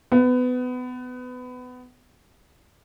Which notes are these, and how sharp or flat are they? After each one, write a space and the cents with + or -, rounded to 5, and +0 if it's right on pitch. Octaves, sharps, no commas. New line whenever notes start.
B3 +25